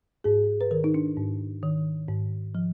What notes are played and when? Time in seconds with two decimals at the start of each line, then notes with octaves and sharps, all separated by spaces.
0.24 G#2 G#4
0.61 B4
0.71 D#3 A#4
0.84 D#4
0.94 D4
1.17 G#2
1.63 D#3
2.08 G#2
2.55 F3